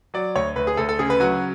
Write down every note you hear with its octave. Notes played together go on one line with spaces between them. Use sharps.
F#3 D5
D2 C#5
D2 B4
G#4
D2 A4
A4
C#3 G#4
B4
F#3 F#4